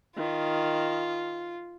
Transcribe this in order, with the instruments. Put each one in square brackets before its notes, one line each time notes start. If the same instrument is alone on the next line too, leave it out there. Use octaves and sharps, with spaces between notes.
[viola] D#3 [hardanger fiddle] F4